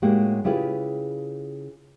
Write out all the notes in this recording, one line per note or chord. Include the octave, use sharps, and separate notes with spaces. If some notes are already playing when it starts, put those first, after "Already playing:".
A2 G#3 A#3 D#4 F#4 G4
C#3 E4 F4 G4 G#4 B4